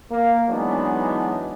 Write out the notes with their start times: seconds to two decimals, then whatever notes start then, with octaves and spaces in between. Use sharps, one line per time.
0.10 A#3
0.49 E3 F#3 G#3 B3 D4 D#4